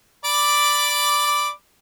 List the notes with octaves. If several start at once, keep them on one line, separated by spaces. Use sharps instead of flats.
D5 B5 D6